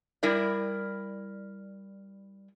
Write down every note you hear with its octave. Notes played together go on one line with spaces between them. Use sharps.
G3 E4 A#4 D5